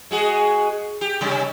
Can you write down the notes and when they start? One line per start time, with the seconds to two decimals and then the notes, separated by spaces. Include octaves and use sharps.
0.11 G#3 F#4 G#4
1.01 G4
1.21 C3 G3 C#4